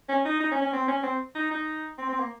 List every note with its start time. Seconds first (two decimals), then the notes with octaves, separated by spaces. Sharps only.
0.09 C#4
0.25 D#4
0.40 D#4
0.51 C#4
0.62 C#4
0.73 C4
0.88 C#4
1.03 C4
1.35 D#4
1.51 D#4
1.98 C4
2.09 C4
2.19 A#3